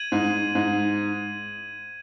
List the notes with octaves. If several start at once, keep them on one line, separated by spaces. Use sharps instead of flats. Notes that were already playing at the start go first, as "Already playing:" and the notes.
Already playing: G#6 D#7 F#7
G#2
G#2